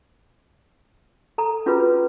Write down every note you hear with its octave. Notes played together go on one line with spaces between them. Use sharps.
A4 A#5
C#4 F4 F#4 G#4 B4
B4